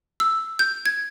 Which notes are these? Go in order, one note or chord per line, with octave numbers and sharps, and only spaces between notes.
E6
G6
G#6